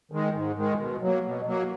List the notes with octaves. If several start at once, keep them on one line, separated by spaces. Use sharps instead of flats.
D#3 G#3
G#2
D#3 G#3
B2
F#3 A#3
B2
F#3 A#3